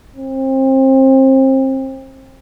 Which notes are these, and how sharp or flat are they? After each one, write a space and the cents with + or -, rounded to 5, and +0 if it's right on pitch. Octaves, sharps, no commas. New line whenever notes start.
C4 +30